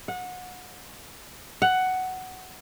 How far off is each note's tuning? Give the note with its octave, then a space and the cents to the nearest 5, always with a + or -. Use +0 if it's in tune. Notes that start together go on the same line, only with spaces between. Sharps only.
F#5 -25
F#5 +10